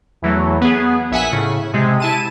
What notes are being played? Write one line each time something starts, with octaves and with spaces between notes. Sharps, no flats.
E2 E3 F#3 A3
B3 G#4
A#1 E5 F#5 G#5 B6
A2 C#3
C3 G#3
E4 A5 D#7